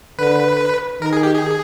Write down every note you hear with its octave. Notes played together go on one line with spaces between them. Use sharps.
D3 B4
D#3 A#4
G#4
G4
G#4